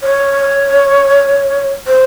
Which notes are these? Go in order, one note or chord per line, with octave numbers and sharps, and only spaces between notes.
C#5
C5